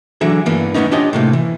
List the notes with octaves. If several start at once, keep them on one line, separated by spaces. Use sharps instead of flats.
D3 E3 F#3 G#4
G2 E3 A#3 B3
E2 C3 B3 C#4 D#4
C#4 D4 F4 G4 C#5 D#5
A2 C3 A#3
E3